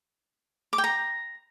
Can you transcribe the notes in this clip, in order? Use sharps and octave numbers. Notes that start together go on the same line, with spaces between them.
D6
G5
A#5